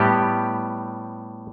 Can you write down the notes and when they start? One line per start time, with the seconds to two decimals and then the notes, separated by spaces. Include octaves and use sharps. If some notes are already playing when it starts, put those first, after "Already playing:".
Already playing: A2 G3 B3 G4